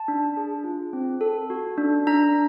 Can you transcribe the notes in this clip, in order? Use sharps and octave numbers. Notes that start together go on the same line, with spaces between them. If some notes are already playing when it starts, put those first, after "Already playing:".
Already playing: A5
D4
G#4
F4
C4
A4
F#4
D4
D4 A#5